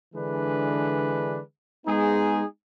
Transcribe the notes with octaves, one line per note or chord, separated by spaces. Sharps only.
D3 E3 G#3 D4 B4
G#3 B3 D#4 G#4